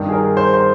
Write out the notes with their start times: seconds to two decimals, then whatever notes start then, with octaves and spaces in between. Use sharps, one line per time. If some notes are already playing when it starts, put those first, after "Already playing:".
Already playing: G2 D#3
0.09 G#4
0.13 A#4
0.37 C5
0.53 C5